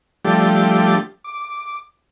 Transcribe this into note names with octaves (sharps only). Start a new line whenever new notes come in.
F3 G3 A3 D4 G4
D6